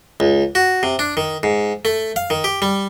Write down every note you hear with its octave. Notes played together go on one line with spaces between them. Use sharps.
C#2
F#4
C3
D4
D#3
G#2
A3
F5
D#3
G4
G3